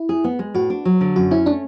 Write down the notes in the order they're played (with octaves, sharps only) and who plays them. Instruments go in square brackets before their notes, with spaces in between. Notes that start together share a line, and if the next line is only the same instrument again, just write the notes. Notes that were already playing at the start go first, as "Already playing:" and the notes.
Already playing: [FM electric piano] E4
[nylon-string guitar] G#4
B3
G#3
[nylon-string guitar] A2 [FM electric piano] F#4
[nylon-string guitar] D4
F#3
D3
[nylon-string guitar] F#2 [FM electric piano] F#4
[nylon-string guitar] C#4 [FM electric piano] E4
[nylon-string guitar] A3 [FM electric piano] D4